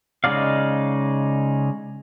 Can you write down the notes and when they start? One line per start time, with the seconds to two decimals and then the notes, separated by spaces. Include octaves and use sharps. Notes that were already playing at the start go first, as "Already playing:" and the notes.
0.24 C#3 G#3 D#4 D5 F5